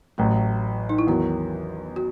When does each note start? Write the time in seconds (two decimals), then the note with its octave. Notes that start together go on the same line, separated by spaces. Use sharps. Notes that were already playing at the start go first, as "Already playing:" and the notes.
0.18 A1 A2 F#3 A3
0.89 D#4
0.98 E4
1.07 E2 D#3 F#3 F#4
1.96 F#4